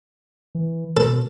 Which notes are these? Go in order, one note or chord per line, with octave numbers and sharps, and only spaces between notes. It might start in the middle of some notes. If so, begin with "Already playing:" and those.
E3
B2 A4